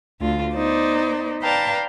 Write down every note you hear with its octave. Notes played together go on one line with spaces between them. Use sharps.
D2 F4
B3 D#4 C5 D5
B4 D5 F5 G5 A5 A#5